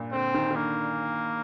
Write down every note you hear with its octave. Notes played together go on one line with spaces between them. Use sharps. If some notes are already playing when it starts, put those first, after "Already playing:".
Already playing: G2 A#2
D3 C4
D#3
D#3
D3 A#3